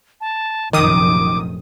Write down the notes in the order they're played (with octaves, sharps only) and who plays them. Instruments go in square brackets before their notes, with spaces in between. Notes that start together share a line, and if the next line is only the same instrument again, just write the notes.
[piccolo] A5
[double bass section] F1 A#1 F#2 [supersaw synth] D#3 D#6 [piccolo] D6